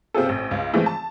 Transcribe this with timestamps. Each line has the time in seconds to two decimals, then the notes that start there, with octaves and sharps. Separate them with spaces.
0.14 C3 C4 F4 G#4 A4
0.26 A1 C4
0.51 C#2
0.74 E3 F3 G#3 A3 C4
0.86 A5